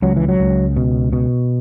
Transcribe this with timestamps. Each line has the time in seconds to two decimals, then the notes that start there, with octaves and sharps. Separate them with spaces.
0.02 C#2 F#3
0.16 E3
0.28 F#3
0.40 C#2
0.76 B2
1.13 B2